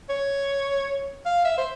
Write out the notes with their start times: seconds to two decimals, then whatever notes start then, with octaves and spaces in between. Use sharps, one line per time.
0.09 C#5
1.25 F5
1.45 E5
1.58 C5